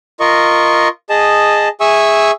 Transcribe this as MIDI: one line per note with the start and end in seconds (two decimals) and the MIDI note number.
0.20 0.88 65
0.20 0.88 70
0.20 0.88 75
0.20 0.88 85
1.10 1.68 68
1.10 1.68 75
1.10 1.68 81
1.81 2.31 68
1.81 2.31 76
1.81 2.31 80
1.81 2.31 85
1.81 2.31 88